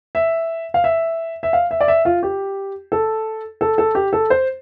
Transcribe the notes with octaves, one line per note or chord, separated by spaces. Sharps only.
E5
F5
E5
E5
F5
E5
D5
E5
F4
G4
A4
A4
A4
G4
A4
C5